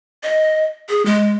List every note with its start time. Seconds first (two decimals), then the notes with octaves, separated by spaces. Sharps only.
0.23 D#5
0.89 G#4
1.06 G#3